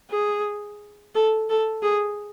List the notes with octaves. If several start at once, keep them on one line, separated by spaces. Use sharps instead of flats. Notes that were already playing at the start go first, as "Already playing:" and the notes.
G#4
A4
A4
G#4